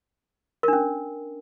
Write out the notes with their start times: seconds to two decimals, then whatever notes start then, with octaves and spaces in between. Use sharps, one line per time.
0.63 A#4
0.68 D4
0.73 C#4